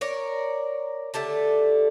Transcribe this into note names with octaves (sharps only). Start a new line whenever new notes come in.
A#4 C#5 D5
D3 A3 G4 A5